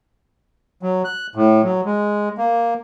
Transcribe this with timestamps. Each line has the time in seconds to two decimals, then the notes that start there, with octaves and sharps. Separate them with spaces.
0.83 F#3
1.05 F#6
1.35 A2
1.64 F#3
1.85 G#3
2.38 A#3